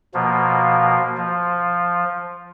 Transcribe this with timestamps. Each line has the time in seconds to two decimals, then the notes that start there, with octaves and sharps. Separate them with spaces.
0.14 B2 F3 A#3
1.17 F3